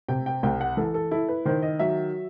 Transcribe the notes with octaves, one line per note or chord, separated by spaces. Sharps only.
C3 G5
G5
C2 G5
F#5
E3 A4
A4
E4 A4
B4
D#3 C5
D#5
F#3 E5